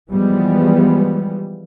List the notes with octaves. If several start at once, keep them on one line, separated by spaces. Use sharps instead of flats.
E3 F3 G3 G#3 B3